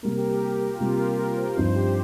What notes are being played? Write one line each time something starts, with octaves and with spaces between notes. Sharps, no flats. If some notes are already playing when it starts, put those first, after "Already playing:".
C3 G3 A#3 A#4
G4
A#4
A#4
A#4
F4
C3 G3 A#3 G4
A#4
A#4
C5
G2 F3 C4 D#4 C5
G4